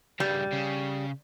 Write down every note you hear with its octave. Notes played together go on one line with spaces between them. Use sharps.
G2 C#3 G3
C#3